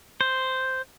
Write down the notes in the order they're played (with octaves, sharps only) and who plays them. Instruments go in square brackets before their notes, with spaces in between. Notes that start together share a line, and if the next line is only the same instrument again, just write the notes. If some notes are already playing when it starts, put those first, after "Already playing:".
[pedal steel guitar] C5